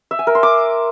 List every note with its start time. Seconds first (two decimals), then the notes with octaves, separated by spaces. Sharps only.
0.11 E5
0.19 G#5
0.27 A#4
0.35 C6
0.43 D6